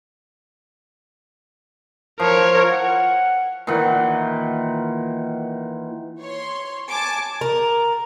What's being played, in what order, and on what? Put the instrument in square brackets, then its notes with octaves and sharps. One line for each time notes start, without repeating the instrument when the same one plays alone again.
[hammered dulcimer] F3 [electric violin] A#4 C#5
[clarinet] F#5
[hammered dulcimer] A#2 D#3 E3 F#5
[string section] C#5 C6
G#5 A5 D6
[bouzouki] A#4